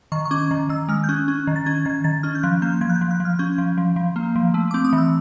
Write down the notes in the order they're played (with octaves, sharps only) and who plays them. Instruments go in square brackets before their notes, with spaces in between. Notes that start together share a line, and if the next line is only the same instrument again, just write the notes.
[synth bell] D#3 C#6
C#6
C#4 D6
D#3
D#3 E6
G#3 F6
G6
C#4 F#6
C#4
D#3
A6
C#4 G#6
D#3 G#6
D#3 A6
C#4 F6
G6
F3 F#6
A#3 G6
F3 G#6
F#6
G6
F3
F#6
F3
F6
C#4 G6
F3
F3
F3
A#3
F3
A3
C4 D6
D#6
E3
E6